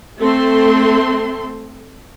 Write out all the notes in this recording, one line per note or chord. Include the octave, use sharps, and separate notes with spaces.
A3 C4 A4 C6